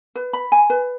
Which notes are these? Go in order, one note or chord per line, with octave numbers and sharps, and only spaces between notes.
B4
B5
G#5
B4